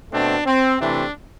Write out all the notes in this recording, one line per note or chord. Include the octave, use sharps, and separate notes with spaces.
B2 A3 C4 D4
C4
C3 E3 A3 C4 D4